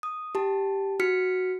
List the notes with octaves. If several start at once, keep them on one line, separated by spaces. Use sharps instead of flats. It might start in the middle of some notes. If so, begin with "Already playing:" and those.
D#6
G4 A5
F#4 F6 B6 C#7